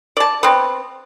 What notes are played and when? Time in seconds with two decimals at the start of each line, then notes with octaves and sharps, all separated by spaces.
0.17 D5 A5
0.43 B3 C4